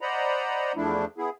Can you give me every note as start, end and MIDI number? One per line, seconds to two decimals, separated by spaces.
0.01 0.72 72
0.01 0.72 74
0.01 0.72 75
0.01 0.72 78
0.01 0.72 82
0.01 0.72 83
0.76 1.05 40
0.76 1.05 53
0.76 1.05 57
0.76 1.05 62
0.76 1.05 64
1.18 1.30 59
1.18 1.30 64
1.18 1.30 68